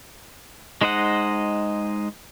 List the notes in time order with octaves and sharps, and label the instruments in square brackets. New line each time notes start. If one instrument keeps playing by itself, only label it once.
[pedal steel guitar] G#3 D#4 C5 D#5 F#5